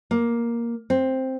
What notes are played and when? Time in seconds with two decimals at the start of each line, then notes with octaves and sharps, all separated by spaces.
0.11 A#3
0.90 C4